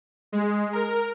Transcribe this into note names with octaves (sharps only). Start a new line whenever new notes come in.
G#3
A#4